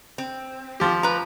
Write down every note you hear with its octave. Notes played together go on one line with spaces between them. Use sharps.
C4
F3 G4
B4 A#5